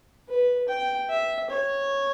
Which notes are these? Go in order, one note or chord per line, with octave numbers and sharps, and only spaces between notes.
B4
G5
E5
C#5